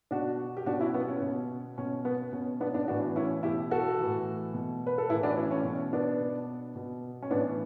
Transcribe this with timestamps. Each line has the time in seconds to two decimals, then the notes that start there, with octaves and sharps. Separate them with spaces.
0.11 B2 D4 F#4
0.57 G4
0.66 B2 D4 F#4
0.80 C#4 E4
0.94 B3
1.08 C#4
1.22 B2
1.78 B2 C#4
2.05 B3
2.32 B2 C#4
2.60 B3 D4
2.74 B3 D4
2.88 A2 E3 D4 F#4
3.16 C#4 E4
3.43 B2 E4 G4
3.71 F#4 A4
3.99 A2 E3
4.54 B2
4.87 B4
4.98 A4
5.09 A2 E4 G4
5.14 E3
5.23 D4 F#4
5.37 C#4 E4
5.51 C#4
5.64 B2 C#4
5.93 B3 D4
6.20 B2
6.76 B2
7.22 C#4
7.31 A2 E3 B3 D4